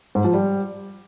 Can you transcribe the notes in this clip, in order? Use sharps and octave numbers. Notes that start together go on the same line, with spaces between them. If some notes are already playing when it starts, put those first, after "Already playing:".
G#2
F3
G3